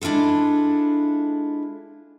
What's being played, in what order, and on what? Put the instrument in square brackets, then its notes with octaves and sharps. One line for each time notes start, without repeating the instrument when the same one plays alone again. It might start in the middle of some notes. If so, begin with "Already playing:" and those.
[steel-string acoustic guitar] G#3 D4 E4 F4 A4